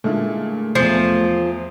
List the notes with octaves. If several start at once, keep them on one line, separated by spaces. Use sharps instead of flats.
A#2 D3 G#3 A3 E4
E2 F3 C6 C7